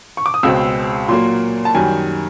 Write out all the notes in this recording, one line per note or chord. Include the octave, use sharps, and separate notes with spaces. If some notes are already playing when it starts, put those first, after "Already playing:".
C#6
D6
D#6
C#2 B2 G#3 C4 E6
A#2 F#3 A#3 C6
A5
F#2 D#3 G3 G#5